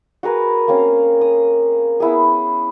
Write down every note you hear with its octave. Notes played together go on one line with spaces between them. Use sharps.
F#4 G#4 A#4 B4
A#3 C4 C#4 F5
D#6
B3 E4 G#4